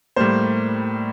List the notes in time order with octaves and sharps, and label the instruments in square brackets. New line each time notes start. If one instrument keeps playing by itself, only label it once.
[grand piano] A2 G3 A#3 C5